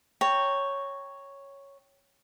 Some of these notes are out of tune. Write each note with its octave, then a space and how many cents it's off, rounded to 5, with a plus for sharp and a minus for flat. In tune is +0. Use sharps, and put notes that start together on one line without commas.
C#5 +0 G5 +0 A#5 -15